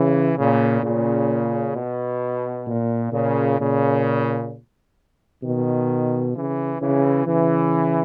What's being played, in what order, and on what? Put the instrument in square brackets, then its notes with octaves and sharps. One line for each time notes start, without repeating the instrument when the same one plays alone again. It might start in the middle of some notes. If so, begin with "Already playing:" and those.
Already playing: [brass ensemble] C#3 E3
A#2 C#3
A#2 C#3
B2
A#2
A#2 C#3
A#2 C#3
B2 D#3
C#3 E3
C#3 E3
C#3 E3